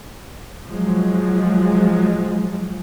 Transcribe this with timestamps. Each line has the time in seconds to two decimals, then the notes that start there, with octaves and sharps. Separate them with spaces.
0.69 F3 F#3 G#3